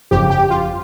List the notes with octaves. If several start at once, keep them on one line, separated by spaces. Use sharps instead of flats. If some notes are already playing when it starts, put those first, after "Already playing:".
G1 F2 C#3 F3 G4
G4
F4